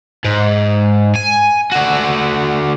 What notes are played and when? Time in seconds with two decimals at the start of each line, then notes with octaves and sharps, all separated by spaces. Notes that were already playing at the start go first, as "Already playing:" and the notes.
0.25 G#2
1.16 G#5
1.72 D3 F#4